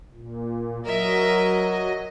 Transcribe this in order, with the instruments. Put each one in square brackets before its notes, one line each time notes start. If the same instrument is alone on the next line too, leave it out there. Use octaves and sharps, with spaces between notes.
[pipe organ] A#2
[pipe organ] F#3 D#5 [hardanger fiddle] A#4 E5